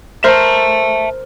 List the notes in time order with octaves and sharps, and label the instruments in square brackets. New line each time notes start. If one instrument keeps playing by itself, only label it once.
[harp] A#4 C5 [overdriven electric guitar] E5 A5